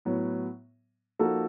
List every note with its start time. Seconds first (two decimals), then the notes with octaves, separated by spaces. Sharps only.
0.05 A2 F#3 B3
1.19 F3 A#3 D#4 F#4 A4